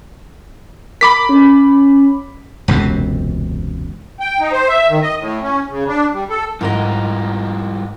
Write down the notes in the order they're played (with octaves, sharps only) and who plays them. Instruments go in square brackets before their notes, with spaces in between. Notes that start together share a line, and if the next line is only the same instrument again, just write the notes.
[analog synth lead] A#4 [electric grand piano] B5 D6 B6
[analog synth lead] C#4
[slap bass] E1 C#2 F#2 C3
[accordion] G5
D#4
C5
E5
D#3
D#5
A2
C#4
C#3
D4
G3
A4
[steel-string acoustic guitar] G#2 A#4 D#5 [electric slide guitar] G3 E4 F4